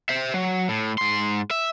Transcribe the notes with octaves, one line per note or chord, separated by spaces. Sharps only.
C5 E5
F#3
A2
G#2 C6
E5